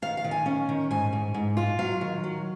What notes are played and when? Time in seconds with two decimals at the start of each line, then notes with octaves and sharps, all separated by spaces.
0.02 D#3 F5
0.17 F5
0.24 D#3
0.31 G#5
0.46 C#4
0.69 D#3
0.91 G#2 G#5
1.13 G#2
1.34 G#2
1.57 F4
1.79 F#3 F5
2.01 D#3
2.24 F#3